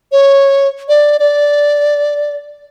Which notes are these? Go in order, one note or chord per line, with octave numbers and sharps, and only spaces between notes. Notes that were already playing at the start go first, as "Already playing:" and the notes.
C#5
D5
D5